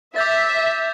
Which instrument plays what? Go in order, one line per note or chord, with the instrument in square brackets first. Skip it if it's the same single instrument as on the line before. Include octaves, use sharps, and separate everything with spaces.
[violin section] E5 [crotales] D6 G6 A6